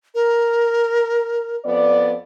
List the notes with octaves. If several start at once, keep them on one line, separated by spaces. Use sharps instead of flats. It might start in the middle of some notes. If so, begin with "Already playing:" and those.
A#4
F2 B3 D5